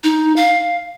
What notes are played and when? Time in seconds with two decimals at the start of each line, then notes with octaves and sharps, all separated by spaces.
0.04 D#4
0.36 F5